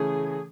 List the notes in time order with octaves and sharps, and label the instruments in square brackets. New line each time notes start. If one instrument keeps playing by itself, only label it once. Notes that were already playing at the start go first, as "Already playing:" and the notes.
Already playing: [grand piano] C#3 E3 A3 C#4 [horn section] G#4